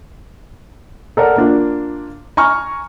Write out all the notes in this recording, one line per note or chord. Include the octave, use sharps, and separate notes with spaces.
A4 A#4 D5 F#5
A#3 D4 F4
G#5 A#5 C#6 F6